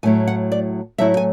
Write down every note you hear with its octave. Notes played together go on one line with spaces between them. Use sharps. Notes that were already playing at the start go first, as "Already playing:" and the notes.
A2 F#3 A3 E4 G#5
F#5
D5
A2 F#3 A3 E4 E5
G#5